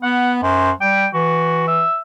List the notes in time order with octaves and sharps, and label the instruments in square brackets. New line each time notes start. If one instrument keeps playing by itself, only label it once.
[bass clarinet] B3 [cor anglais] F#5
[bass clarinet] F#2 [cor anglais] C5
[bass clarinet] G3 [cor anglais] G5
[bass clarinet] E3 [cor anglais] F#4
[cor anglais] E5